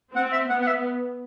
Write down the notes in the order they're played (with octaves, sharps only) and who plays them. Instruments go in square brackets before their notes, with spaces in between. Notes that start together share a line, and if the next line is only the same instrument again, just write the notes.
[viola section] C4 [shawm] F#5
[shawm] E5
[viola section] B3 [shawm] F#5
[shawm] F#5
E5